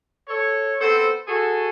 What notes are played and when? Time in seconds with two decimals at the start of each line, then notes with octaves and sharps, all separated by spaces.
0.28 A4 C#5
0.80 B3 C4 A4 C5
1.27 F#4 G#4 A4